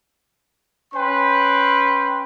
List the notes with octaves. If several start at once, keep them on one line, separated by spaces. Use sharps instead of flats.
C#4 B4 G5 C6